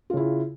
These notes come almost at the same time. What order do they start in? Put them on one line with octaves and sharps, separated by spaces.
F4 C#3 E4